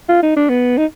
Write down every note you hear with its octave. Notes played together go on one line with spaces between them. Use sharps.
F4
D#4
D4
B3
D#4